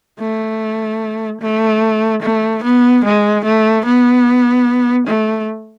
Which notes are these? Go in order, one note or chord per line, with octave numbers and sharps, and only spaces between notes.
A3
A3
A3
B3
G#3
A3
B3
A3